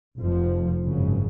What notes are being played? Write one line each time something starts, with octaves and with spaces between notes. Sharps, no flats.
F1 F2 F3
G#1 F#2 C#3